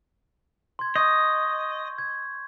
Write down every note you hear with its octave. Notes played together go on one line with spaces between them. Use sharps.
C6 G#6
D#5 C#6 G6
G#6